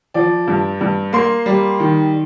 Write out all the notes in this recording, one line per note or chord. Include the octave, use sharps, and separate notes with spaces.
F3 D5
G2
G2
A#3 C6
G3
D#3